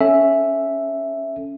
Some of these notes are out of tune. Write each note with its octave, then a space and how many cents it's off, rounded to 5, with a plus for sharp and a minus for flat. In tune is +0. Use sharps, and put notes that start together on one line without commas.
C#4 +0 A4 +5 E5 +0